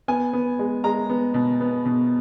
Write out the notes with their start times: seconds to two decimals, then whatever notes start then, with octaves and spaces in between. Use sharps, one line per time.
0.08 B3 G#5
0.33 B3
0.59 G#3
0.84 G#3 A#5
1.10 B3
1.34 B2
1.61 B3
1.85 B2